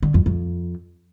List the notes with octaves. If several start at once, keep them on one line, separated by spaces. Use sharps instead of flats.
D3
F2
F2